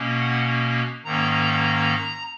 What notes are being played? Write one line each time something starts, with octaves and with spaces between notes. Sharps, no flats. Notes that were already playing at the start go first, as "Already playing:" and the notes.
Already playing: B2 A#3 C#4
F#5
G#2 D#3 A#3 C#4 A#5